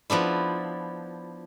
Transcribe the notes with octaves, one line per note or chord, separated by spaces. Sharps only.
F3 B3 D4 E4